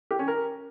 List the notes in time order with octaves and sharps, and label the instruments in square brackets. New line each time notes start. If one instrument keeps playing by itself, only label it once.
[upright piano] G4
C#4
A#4